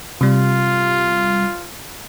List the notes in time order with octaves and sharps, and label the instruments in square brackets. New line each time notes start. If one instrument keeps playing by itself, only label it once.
[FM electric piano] C3 G3 [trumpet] F4